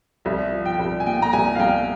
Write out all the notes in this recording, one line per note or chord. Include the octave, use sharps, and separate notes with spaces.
C2 E5
F3
G5
C2
G#5
A#2 G5
A#5
C2 G#5
F5
C2 G5